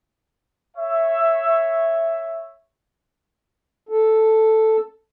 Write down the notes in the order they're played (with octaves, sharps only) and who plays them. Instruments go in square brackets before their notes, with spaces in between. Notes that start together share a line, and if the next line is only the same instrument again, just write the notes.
[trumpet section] C#5 E5
[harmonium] A4